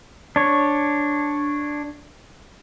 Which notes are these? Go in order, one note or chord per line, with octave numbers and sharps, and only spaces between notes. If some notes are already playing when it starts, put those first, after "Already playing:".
D4 C#5